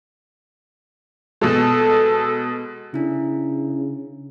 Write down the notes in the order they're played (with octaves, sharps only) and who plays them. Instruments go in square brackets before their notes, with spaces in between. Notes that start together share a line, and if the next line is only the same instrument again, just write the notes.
[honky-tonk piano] B2 G#3 [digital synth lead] A4
[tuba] C#3 [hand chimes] D4 E4